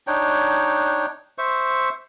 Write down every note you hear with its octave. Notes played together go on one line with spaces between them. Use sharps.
D4 D#4 C#5 G5
C5 E5 C#6